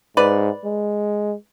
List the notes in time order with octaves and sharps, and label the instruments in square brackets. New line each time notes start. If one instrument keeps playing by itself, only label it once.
[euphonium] G#2 [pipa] B4 D5
[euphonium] G#3